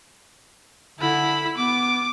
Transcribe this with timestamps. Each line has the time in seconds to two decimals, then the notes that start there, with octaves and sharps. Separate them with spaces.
0.99 D3 E4 B5
1.58 B3 D6